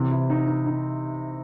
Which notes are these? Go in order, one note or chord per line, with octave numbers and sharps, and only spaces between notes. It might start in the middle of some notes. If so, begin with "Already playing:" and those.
Already playing: C3 E3 C4
E4
D#4
D#4
D#4